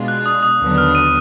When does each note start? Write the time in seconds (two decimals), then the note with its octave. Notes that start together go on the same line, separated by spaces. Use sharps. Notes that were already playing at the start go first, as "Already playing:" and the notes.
Already playing: B2 G#3 D4 F4
0.08 F#6
0.26 D#6
0.43 D#6
0.60 D#2 D3 F#3 B3 D4
0.78 F6
0.95 D#7